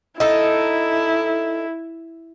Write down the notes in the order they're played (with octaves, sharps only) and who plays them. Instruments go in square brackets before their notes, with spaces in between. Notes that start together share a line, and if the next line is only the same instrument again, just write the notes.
[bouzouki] D#4 A4 [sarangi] E4